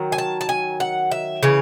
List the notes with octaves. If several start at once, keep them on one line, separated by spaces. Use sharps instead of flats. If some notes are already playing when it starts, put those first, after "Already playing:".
Already playing: D#3 F#3
G#5
A5
A5
G#5
F#5
E5
C#3 E3 C#5